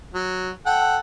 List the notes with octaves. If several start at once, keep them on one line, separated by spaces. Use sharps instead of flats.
F#3
A4 F#5 G5